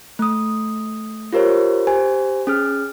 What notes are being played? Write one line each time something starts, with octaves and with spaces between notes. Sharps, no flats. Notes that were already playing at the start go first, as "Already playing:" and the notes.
A3 D#6
F4 G4 A#4 C5 C#5
G4 C5 G#5
C#4 G#4 F6